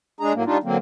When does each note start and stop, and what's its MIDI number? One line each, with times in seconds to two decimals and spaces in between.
0.20 0.33 56
0.20 0.33 62
0.20 0.33 68
0.20 0.33 82
0.34 0.44 45
0.34 0.44 54
0.34 0.44 58
0.45 0.58 55
0.45 0.58 62
0.45 0.58 63
0.45 0.58 65
0.63 0.77 50
0.63 0.77 54
0.63 0.77 58
0.63 0.77 60